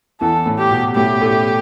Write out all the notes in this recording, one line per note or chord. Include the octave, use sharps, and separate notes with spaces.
E2 E3 A4
A2
G4
B2
A2 A3 G4
A2 A3